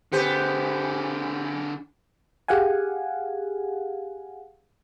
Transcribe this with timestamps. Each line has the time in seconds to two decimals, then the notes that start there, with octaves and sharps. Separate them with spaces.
0.12 D3 B3 G4 G#4 C5
2.48 G4 G#4 F5 F#5 G#5